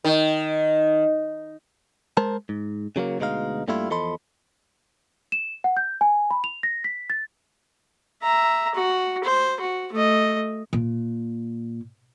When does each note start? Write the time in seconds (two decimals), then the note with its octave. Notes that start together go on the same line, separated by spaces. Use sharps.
0.04 D#3
2.17 G#3 A#4 C5 A5
2.49 G#2
2.96 C#3 F#3 A3 A#3
3.19 D2 B2 G#3 D#4 F5
3.68 G2 G3 A3 A#3 E4 F4
3.90 E2 F3 A4 D#5 B5 C6
5.32 E7
5.64 F#5
5.77 G6
6.01 G#5
6.31 B5
6.44 F7
6.63 A#6
6.84 B6
7.10 A6
8.23 E5 A#5
8.75 F#4
9.24 C5
9.60 F#4
9.93 A3 D#5
10.73 A#2